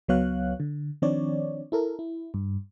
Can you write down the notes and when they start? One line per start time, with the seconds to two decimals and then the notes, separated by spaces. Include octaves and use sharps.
0.08 C#2 F#3 B3 C#5 F5 F#6
0.60 D3
1.02 D#3 F3 C4 D4 C#5 D5
1.72 E4 A4 A#4
1.99 E4
2.34 G2